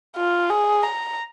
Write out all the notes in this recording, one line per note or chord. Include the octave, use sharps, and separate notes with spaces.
F4
G#4
A#5